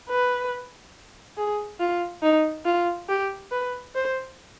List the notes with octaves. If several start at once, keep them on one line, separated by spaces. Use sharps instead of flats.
B4
G#4
F4
D#4
F4
G4
B4
C5